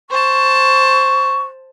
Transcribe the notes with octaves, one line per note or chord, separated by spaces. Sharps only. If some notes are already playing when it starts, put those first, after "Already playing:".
C5 A5 C#6